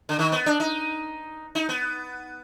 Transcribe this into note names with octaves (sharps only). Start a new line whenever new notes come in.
D3
D#3
B3
D4
D#4
D#4
B3